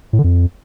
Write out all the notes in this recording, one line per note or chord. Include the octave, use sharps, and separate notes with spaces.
A2
D3
F2